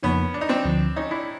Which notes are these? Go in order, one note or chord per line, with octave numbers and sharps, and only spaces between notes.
F2 C#3 F3 A#3 B3 C#4 D#4
D4
D#4
C4 D4
D2 D3 F3
C#4 D#4
D4 E4